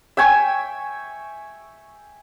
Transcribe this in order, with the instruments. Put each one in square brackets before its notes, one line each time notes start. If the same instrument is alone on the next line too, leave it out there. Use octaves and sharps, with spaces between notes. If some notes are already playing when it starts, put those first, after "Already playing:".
[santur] E5 G5 G#5 C#6